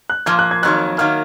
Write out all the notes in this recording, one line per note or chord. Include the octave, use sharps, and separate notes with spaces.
F#6
A#2 F3 A#3 G#6
F#6
G#6
F2 D#3 F#3 A#3 F#6
D#3 F#3 A#3 F6